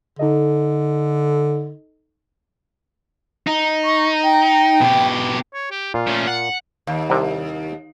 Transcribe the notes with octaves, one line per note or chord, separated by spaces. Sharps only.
D3 D#4 A4 D#5
D#4
C#6
G5
B2 G4
C#5
G4
A#2 F4
A3 C#4
F#5
D#2
C2 C3